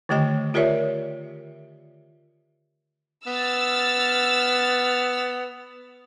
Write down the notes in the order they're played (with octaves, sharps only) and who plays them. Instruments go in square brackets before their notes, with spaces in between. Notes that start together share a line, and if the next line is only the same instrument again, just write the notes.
[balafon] D3 D#3 A3 G4 D#5 G5
F4 G4 A#4 C#5 D5 E5
[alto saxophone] B3 [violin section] E6 F6 A6